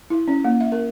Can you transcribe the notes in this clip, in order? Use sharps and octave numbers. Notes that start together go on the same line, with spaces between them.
E4
C#4
A#3
E5
A#4